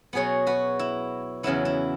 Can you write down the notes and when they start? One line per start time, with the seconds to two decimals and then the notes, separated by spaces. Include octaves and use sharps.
0.13 B2 F#3 B3 G#4 C#5
0.47 F#4 B4
0.79 E4
1.43 E2 C#3 F#3 B3 E4
1.65 E4